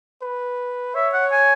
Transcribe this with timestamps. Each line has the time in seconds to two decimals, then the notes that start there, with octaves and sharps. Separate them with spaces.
0.22 B4
0.95 C#5 E5
1.14 F#5
1.32 G#5